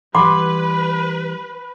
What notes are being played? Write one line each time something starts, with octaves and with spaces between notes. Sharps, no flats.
E3 G3 B4 F#5 B5 C6 D6